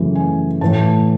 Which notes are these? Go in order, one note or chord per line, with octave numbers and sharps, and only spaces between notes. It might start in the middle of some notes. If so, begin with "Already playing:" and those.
Already playing: F#2 C#3 E3 A3
G#5
A2 E3 A3 A5